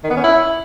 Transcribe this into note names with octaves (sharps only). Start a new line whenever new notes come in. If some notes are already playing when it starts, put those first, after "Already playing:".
D#3
B3
C#4
E4